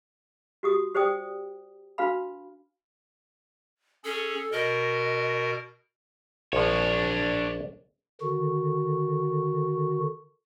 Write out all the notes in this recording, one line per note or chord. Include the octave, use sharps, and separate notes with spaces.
F#4 G4 D#6
G4 C5 D5 G5 D#6
D4 F#4 B4 F5 B5
C#4 G#4 A4
B2 A#4 D#5
A#1 F3 D4 C#5
D3 D#3 F#4